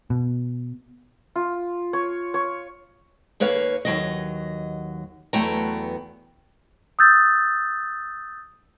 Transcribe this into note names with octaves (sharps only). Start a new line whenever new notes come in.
B2
F4
C#5
C#5
D#2 A#3 B4 C#5 F5
D#2 C3 F#3 D#5
E2 F#3 A3 B3 G5 A#5
D#6 E6 G6 A6